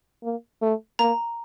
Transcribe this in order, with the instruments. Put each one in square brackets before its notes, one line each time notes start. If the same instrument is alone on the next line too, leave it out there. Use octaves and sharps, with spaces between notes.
[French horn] A#3
A3
[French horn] A#3 [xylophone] A#5